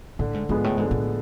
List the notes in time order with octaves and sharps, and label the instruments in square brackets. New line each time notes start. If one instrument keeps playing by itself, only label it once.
[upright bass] A2 [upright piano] D3
[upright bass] G#2
[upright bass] G#2 [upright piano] F3 G#3 B3
[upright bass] A2
[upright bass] G#2 [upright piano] D3
[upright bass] A2